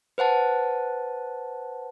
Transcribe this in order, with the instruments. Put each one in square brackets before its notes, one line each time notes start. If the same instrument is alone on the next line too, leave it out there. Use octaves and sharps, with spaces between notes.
[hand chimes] B4 C5 F#5 A5